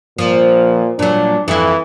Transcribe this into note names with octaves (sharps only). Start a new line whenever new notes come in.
A#2 F3
A#2 F#3 D4
F2 E3 E4